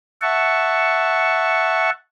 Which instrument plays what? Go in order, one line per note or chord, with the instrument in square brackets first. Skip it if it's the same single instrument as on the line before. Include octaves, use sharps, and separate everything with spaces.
[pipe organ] E5 F#5 A5 C#6